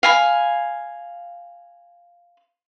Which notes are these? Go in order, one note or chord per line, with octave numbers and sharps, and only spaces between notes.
F5 G#5 B5